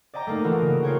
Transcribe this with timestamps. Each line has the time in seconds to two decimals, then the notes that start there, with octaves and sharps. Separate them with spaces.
0.14 D5 D#5 G5 A#5 D6
0.27 A3 A#3 D#4
0.44 E3 F4 F#4 A#5
0.62 C#3 D7
0.83 F4 A#4 C#5 G5